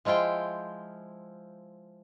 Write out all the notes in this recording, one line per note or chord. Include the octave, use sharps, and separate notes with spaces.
F3 G#3 E4 F4 G5